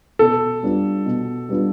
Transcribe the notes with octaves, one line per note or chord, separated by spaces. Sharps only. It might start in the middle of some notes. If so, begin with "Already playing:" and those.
B2 A4
G3 B3 D4 F4
B2
G3 B3 D4 F4